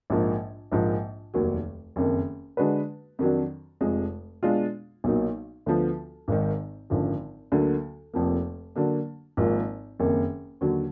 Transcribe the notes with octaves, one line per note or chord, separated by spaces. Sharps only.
A#1 G#2 F3 A#3
A#1 G#2 F3 A#3
F1 D#2 D#3 F#3
F#1 F2 D#3
D3 G#3 D4 F#4 B4
F2 D#3 F#3 D4
F1 F2 F3 G#3
B2 G#3 D4 F4
B1 A#2 F#3 A#3 D#4
D2 D3 F3 B3
G#1 G#2 D#3
G#1 F#2 D3 F3
D2 D3 F#3 A#3
F1 F2 F3 A#3
D3 F#3 A#3 D4
G#1 G#2 F3 A#3 F4
F#1 F2 D#3 A#3
D#2 D3 F#3